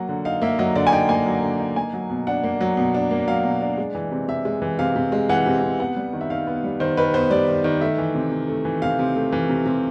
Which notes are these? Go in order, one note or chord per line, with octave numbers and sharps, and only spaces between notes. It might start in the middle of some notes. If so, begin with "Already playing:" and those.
Already playing: F#3 A#3 F#5
D3
D#4 F5
A#3 E5
F#3 D#5
D3 D5
G#5
D#4 G5
A#3 G#5
F#3
D3
D#4
A#3 G#5
F#3
B2
D4 F#5
A#3
F#3
B2
D4
A#3
F#3 F5
B2
D4
G#3
E3
C3
C3 E5
G#3
E3
C3 F5
C3
G#3
E3 F#5
C3
C3
B3 F#5
G3
D#3
E5
D#3 F5
B3
G3
D#3 C5
D#3 B4
B3 C5
G3 D5
D#3
D#3
A3 E5
E3
C3
C3
A3
E3
C3 F5
C3
A3
E3
C3
C3